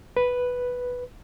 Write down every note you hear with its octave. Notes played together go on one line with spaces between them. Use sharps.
B4